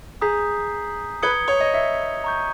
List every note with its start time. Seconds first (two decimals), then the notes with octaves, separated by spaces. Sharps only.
0.22 G#4 A#5 D#6 G6 B6
1.22 B4 D#6 G#6 C#7 G7
1.48 C#5
1.60 D#5
1.74 E5
2.24 A#5 C#6 G6